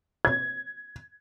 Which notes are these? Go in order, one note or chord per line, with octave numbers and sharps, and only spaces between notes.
G#6